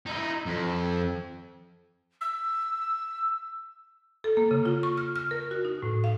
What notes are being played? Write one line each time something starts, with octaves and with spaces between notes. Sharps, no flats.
D#4 E4
F2
E6
A4
A#3
C#3
F4
C#6
F6
F6
A#4
F#4
D#4
A2
F5